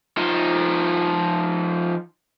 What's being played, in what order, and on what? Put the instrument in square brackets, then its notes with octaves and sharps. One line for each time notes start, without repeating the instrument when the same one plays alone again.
[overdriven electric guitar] F3 D#4